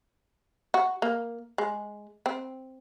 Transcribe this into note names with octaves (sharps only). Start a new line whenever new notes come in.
F#4
A#3
G#3
C4